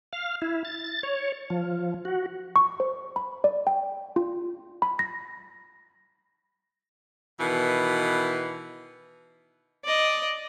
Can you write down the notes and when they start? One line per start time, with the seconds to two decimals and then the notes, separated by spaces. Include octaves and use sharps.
0.13 F5
0.42 E4
0.65 A6
1.03 C#5
1.50 F3
2.05 F#4
2.56 C#6
2.80 C5
3.16 B5
3.44 D5
3.67 G5
4.16 F4
4.82 B5
4.99 A#6
7.39 B2 D#3 E3
9.85 D5 D#5